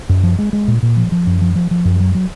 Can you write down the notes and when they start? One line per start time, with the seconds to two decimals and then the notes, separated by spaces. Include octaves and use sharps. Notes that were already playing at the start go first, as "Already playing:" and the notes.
0.09 F#2
0.23 F3
0.39 G#3
0.53 G#3
0.68 A#2
0.82 A#2
0.97 F3
1.12 F3
1.27 F#2
1.41 F3
1.56 F3
1.71 F3
1.85 F#2
2.00 F#3
2.15 F#3